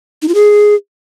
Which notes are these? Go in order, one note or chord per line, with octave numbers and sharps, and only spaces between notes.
D#4
F4
G#4